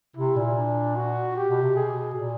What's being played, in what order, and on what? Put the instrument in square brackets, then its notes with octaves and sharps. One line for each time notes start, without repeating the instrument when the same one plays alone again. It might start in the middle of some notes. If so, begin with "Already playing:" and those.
[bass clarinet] C3 [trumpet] E4
[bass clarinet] A#2
[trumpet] D4
F#4
G4
[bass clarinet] B2
C3
[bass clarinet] B2 [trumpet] G#4
[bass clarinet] A#2